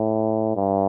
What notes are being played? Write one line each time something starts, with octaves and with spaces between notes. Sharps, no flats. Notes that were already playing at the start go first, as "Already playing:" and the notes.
Already playing: A2
G2